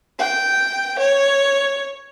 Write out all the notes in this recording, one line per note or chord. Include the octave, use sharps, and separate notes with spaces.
G5
C#5